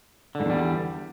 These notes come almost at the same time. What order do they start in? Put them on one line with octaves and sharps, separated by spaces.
D3 G#2 E2 G3